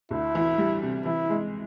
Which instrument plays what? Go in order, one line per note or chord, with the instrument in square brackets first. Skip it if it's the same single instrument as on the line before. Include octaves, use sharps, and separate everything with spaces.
[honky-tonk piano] D2 [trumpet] E4
[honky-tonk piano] E3
G3
C3
[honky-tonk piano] E3 [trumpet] E4
[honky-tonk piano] G#3